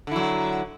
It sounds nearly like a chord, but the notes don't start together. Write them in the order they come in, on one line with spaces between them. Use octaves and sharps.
D3 E4 F#3